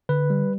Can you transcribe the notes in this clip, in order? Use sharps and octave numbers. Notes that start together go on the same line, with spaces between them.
D3 B4
G3